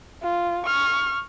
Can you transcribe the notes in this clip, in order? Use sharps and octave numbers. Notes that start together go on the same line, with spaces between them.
F4
C#6 F6